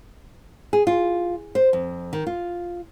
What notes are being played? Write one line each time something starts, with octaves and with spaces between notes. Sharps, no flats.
G#4
F4
C5
F2
D#3
F4